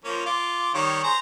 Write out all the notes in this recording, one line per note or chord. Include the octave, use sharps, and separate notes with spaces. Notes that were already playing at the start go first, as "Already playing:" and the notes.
F3 A#3 C#4
F4 D6
D#3 G3 C#5
G#4 C5 A#5